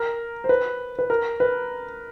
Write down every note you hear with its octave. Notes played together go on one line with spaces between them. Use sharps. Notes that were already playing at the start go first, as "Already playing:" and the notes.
Already playing: A#4
C5
B4
B4
A#4
B4